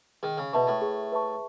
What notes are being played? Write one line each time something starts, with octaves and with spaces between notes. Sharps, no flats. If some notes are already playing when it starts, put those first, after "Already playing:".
D#3 G#4
C#3
B2 B4 E5 A5 C#6
A2
G#4
B4 E5 A5 C#6